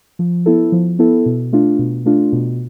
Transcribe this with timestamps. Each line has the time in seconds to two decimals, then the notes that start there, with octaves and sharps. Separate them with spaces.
0.19 F3
0.46 B3 E4 A4
0.72 F3
0.99 B3 E4 A4
1.26 B2
1.53 A3 D4 F4
1.79 B2
2.06 A3 D4 F4
2.33 B2